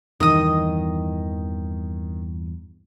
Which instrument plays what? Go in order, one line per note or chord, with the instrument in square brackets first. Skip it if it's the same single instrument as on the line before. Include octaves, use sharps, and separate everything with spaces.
[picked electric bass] E2 G2 E3 [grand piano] D#3 [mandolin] D#5 D#6